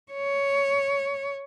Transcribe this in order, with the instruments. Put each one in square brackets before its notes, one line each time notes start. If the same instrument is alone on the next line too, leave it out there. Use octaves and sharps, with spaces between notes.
[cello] C#5